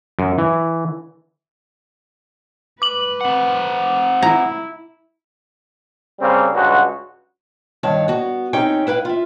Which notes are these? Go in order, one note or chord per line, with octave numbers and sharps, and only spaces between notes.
F#2
E3
B4 D6 F#7
C4 F#5
E4 A#5
C#3 G3 A#3 C4
C#2 G2 F#4
G2 D#3 C#5 F5 A5
B3 F#4
C4 C#4 D#4 G4 C#5 G5
E4 B4 F5 G5
F4 E5